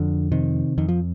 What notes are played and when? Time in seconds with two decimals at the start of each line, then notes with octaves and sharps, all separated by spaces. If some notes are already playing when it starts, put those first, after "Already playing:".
Already playing: F2 D3
0.32 C3 D#3
0.78 F2 D#3
0.89 F3